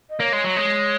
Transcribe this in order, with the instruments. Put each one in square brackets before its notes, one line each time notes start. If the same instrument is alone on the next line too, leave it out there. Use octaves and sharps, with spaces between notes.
[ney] D#5
[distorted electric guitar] A#3 [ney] C#5
[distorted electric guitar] G#3
F#3
G#3